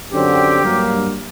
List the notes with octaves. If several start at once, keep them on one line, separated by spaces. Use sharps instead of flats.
F#2 D3 F#3 C4 G4
G2 F#3 A#3